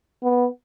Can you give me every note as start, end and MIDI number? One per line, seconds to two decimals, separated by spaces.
0.23 0.47 59